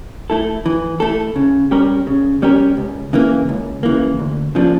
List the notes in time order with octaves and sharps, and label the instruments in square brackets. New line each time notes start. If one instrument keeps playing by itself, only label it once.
[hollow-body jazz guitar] A3 E4 A4
E3
A3 E4 A4
C#3
G3 C#4 G4 A#4
C#3
G3 C#4 G4 A#4
C#2
C#3 E3 A#3
C#2
C#3 E3 A#3
D2
C#3 F3 A#3 D4